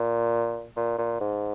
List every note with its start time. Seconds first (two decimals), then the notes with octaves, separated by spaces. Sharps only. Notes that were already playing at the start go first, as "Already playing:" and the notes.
Already playing: A#2
0.77 A#2
0.98 A#2
1.20 G#2